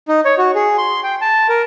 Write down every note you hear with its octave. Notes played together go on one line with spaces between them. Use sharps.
D#4
C#5
F#4
G#4
C6
G5
A5
A#4